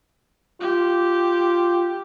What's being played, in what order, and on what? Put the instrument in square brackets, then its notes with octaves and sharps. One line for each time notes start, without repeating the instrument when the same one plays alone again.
[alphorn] F4 [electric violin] G4